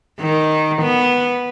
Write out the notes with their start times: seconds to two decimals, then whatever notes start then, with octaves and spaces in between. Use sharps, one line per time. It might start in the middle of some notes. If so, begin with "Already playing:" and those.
0.21 D#3
0.82 B3